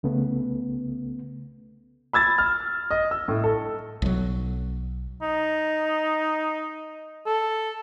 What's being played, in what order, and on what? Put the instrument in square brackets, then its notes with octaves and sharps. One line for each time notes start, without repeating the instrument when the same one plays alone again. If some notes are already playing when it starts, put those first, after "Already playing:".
[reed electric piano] C2 C#3 A3 B3
[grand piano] B5 E6 G#6 A6
F6
D#5
E6
A2
A4
[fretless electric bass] B1 F#3
[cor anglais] D#4
A4